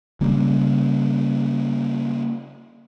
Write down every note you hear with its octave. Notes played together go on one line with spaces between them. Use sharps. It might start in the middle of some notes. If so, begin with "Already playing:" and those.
C#3 G3 A#3 C#4